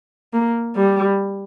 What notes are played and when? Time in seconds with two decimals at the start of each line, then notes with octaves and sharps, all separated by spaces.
0.33 A#3
0.76 G3